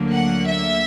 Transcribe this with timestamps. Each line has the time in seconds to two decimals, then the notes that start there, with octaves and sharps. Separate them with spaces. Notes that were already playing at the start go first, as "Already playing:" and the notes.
Already playing: D2 D3 F#3 A#3
0.12 F#5
0.46 E5